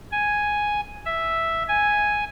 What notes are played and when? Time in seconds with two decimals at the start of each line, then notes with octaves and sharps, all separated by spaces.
0.12 G#5
1.06 E5
1.68 G#5